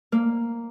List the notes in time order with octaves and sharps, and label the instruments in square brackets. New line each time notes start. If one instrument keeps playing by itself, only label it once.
[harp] A#3